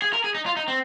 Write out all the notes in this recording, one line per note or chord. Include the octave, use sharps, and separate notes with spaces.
G#4
A#4
G#4
D#4
F4
D#4
C4